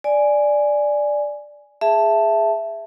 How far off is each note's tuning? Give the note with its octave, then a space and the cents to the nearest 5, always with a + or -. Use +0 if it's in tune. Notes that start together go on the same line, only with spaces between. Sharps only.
D5 +0 G#5 +0
G#4 +0 E5 +10 A5 +0